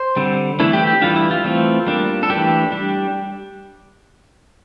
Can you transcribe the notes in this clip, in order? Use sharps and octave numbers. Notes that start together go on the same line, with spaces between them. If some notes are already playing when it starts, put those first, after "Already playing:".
Already playing: C5
D3 G3 C4
E3 A3 D4 E4
G4
G4
E3 G3 D4 F4
E4
F4
E3 A3 C4
G3 A#3 D4
A4
E3 A3 D4 G4
G3 D4